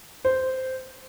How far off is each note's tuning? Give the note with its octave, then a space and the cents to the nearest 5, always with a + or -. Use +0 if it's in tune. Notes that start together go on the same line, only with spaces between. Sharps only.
C5 -10